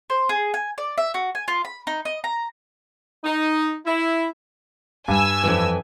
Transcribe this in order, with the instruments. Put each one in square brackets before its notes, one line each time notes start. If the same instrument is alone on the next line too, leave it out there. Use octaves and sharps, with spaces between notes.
[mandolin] C5
G#4
G#5
D5
E5
F#4
G#5
F4
B5
D#4
D#5
A#5
[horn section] D#4
E4
[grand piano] G2 [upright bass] G3 [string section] G#5 E6
[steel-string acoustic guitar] F2 G#2 E3